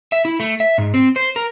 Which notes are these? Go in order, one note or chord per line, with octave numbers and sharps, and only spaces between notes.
E5
E4
A3
E5
G#2
C4
C5
A#4